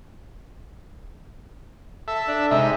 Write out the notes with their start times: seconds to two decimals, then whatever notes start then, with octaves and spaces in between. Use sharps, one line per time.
2.08 A4 E5
2.28 D4
2.51 C3 G#3 D#4 E5